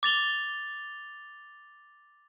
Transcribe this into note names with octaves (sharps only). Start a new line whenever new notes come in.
D6 A6 F7 G7